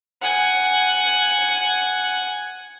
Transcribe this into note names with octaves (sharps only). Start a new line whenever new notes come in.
F#5 G#5